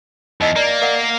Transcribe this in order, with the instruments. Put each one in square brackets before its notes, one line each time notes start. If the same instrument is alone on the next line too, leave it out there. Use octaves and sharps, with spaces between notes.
[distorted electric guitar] E2 [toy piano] D#4 D#5 E6
[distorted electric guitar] A#3 [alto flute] D5
[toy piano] A#4 F5 F#5